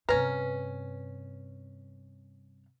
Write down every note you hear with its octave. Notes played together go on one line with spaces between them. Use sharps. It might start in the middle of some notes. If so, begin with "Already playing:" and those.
G2 C3 C#4 B4 A#5